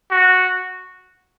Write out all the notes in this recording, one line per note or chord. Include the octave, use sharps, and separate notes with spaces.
F#4